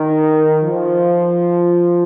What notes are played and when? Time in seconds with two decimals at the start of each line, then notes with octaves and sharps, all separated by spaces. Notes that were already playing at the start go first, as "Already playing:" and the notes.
Already playing: D#3
0.62 F3